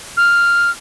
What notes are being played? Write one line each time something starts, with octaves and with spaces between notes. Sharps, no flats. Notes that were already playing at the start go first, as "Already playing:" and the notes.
F6